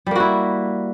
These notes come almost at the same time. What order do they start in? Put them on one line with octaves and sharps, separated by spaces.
G3 A#3 F#4 E4